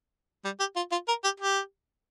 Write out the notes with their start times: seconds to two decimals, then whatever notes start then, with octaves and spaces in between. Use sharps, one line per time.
0.44 G3
0.60 G4
0.76 F4
0.92 F4
1.08 A#4
1.24 G4
1.40 G4